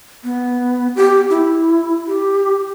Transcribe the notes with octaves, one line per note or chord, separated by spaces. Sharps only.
B3
G4
E4
G4